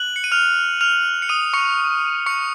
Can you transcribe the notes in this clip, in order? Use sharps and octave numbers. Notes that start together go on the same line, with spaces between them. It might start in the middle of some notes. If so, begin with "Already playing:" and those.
Already playing: F#6 F#7
C#7
D#7
F6 F7
F6 F7
C#7
D#6 D#7
C#6 C#7
C#6 C#7